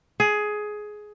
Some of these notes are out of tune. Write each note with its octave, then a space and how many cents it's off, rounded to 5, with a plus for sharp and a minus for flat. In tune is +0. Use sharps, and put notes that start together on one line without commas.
G#4 +15